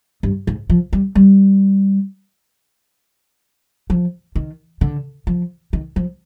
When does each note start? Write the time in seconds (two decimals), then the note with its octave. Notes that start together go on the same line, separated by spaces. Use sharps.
0.23 G2
0.47 G#2
0.70 F3
0.93 G3
1.15 G3
3.90 F3
4.35 D#3
4.81 D3
5.27 F3
5.73 D#3
5.96 F3